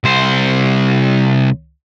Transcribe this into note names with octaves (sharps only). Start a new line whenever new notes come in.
C2 C5